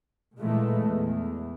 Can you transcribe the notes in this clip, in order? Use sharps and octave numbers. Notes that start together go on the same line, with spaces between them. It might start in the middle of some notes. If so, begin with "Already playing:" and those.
A#2 E3 G#3 A3
E2